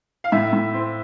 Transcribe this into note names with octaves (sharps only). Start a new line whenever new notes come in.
F5
A2 E5
A2
C4